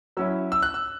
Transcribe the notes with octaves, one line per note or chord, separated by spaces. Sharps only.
F#3 C#4 E4 E6
E6
F#6
E6